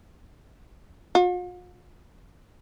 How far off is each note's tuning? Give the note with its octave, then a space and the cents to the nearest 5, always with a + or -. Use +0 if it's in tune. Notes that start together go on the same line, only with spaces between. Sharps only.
F4 +45